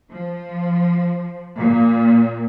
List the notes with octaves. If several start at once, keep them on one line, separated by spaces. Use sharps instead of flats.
F3
A#2